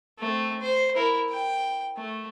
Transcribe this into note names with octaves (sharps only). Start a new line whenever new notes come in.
A3 C4
C5
E4 A#4
G5
A3